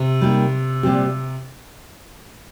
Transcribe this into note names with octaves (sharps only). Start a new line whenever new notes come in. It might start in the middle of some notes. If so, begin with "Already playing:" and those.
Already playing: C3
G3 A#3 D#4 G4
A#2 G3 C4 G4